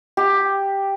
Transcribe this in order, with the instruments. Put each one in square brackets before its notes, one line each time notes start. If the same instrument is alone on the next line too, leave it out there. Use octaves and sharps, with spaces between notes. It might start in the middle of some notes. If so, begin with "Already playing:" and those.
[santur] G4